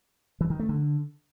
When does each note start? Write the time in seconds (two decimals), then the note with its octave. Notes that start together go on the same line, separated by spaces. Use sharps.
0.41 E3
0.50 D#3
0.60 A3
0.69 D3